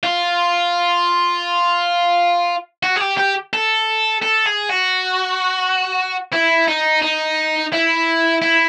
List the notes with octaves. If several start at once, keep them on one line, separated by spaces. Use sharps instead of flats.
F4
F#4
G#4
G4
G4
A4
A4
G#4
F#4
E4
D#4
D#4
E4
E4